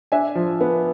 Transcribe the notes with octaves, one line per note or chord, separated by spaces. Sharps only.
D4 E5 G#5
F3
B3